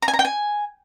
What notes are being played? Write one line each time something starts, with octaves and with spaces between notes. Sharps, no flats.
A#5
G#5
A#5
G5
G#5